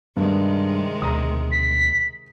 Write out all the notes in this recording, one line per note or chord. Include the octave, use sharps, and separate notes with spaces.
G2 C3 D#3 G#3
D2 B2 A#5 D#6
B6